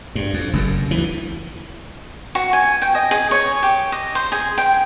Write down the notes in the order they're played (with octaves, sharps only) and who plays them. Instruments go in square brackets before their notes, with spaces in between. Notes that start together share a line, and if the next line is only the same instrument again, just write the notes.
[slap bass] G2
F2
F#1 F#2
D2 E3
[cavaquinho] F#4
G#5
G5
D#5
G#4
C#5
G4
D#5
C5
G#4
G5